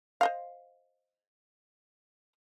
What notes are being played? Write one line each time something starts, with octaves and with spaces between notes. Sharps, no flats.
C5 D#5 F5